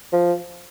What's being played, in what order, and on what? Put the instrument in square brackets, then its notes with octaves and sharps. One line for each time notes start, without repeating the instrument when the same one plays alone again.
[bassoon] F3